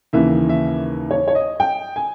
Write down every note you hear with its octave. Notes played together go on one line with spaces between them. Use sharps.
D#2 C#3 E3 A#3 E5
E5
C#5
C#5
D#5
G5
G#5